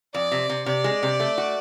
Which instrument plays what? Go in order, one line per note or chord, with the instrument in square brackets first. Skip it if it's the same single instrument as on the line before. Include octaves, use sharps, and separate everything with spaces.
[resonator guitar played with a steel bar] F2 [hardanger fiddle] D5
[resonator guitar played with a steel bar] C3
C3
[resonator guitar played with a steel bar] C3 [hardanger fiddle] D5
[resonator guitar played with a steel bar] G#3
C3
A3
F#4